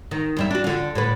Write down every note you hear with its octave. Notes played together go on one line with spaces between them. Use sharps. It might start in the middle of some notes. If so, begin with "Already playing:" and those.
D#3
D#2 G3 E5
D4 F#4
D3 F4
A2 D3 B4